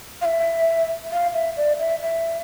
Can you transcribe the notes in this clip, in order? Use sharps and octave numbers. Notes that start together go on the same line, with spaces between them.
F5
E5
F5
E5
D5
E5
E5